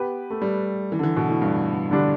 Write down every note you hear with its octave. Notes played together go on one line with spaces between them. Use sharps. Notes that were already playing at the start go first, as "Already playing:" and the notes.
Already playing: B3 G4 B4
A3
G3
E3
D3
E3
B2
A2
G2
D3 G3 D4